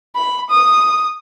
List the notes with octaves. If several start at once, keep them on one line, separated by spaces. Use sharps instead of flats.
B5
D#6